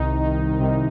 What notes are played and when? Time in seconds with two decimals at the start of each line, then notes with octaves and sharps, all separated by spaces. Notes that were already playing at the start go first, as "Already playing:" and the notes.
Already playing: C2 C3 D#3 D#4
0.58 C2 C3 D#3